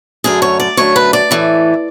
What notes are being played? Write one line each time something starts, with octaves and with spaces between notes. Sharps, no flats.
F#2 D3 A3 G#4
C#5
D5
F#2 D3 A3 C#5
B4
D5
A2 E3 A3